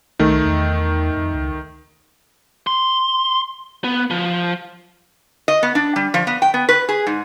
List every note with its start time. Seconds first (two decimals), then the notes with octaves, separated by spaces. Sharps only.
0.19 C2 D#3 A3
0.45 E2
1.17 F2
1.34 C#2
2.67 C6
3.84 B3
4.10 F3
5.48 D#5
5.63 B3
5.75 D4
5.96 G3
6.14 F3
6.27 B3
6.42 G5
6.54 B3
6.69 B4
6.89 G#4
7.07 G#2